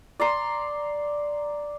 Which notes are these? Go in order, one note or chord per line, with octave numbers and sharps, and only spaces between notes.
D5 A#5 C6